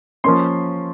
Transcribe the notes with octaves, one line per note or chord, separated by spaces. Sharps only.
F3 A#3 C#4 C6